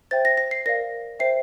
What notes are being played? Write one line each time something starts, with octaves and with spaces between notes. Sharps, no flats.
C5 E5 G5 A6
A#6
A#6
C7
A#4 D5 F5 A#6
C5 E5 G5 C7